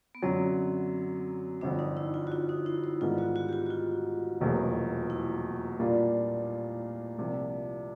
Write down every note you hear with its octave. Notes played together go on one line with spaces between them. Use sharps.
B3
F#2 D3 F#3 C4
G1 F2 D3 D4
D#4
E4
F4
F#4
F4
D#4
E4
E4
G#2 D#3 G3 B3 E4 F4
F#4
F#4
G4
F#4
F#4
F4
F1 E2 B2 F#3 A#3
E4
A#2 G3 A#3 D4 F4
C2 C3 F3 A#3 D4